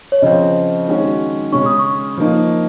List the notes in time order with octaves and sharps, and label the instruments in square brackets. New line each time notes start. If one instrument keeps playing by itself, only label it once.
[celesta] C#5
[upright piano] C#3 F3 C4 [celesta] D#5
[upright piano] D#3 G#3 C#4 F#4
[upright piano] C#3 G#3 C#4 [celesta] C#6
[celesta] D#6
C#6
[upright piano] F3 A#3 D#4